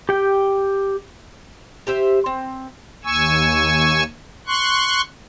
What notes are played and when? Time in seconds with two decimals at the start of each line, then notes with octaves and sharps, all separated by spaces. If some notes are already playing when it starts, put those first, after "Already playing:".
0.09 G4 G5
1.87 G4 C5 E5
2.26 C4
3.04 D#2 G#5 C#6 E6
4.47 C6 C#6 F#6